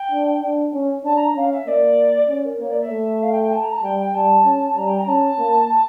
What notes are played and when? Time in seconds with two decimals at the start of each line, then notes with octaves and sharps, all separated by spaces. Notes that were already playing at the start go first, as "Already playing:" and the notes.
Already playing: G5
0.12 D4
0.42 D4
0.74 C#4
1.04 D4 A5
1.15 A#5
1.35 C#4 F5
1.51 E5
1.67 A#3 D5
2.28 C#4
2.44 A#4
2.59 A#3 C#5
2.70 D5
2.80 E5
2.90 A3
3.22 F5
3.32 G5
3.42 G5
3.53 A5
3.62 A#5
3.73 A5
3.83 G3 G5
3.99 G5
4.14 G3 A5
4.45 C#4
4.76 G3 A#5
4.87 G5
4.98 A#5
5.07 C#4 A5
5.39 A#3
5.69 A5